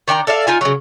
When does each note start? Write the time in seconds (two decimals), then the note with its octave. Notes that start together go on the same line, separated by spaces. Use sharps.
0.08 D#3 D4 G5 A#5
0.27 A4 D5 E5 F5
0.47 D#4 F4 G#5
0.61 C#3 F#3